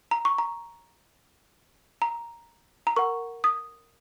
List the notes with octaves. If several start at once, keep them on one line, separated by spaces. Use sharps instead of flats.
A#5
C#6
A#5
A#5
A#5
A#4 F#5 C#6
D#6